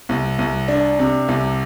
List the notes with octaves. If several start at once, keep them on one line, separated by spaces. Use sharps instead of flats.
C2
C2
D4
C3
C2